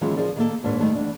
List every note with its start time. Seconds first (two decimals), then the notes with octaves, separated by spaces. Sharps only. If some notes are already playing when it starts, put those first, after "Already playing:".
0.01 D#3 E3 F#3 G#3 C#4 F4
0.17 F3 G#4 A#4 D5
0.36 D#3 A#3 A4
0.63 D#2 G#2 D4 A#4 B4 C#5
0.80 D#3 G3 A3
0.95 E2 D4